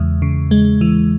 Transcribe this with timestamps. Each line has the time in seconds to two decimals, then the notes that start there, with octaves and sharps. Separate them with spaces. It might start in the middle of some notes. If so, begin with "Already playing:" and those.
Already playing: E2 C#3 E3 G#3
0.22 C#3
0.51 G#3
0.81 E3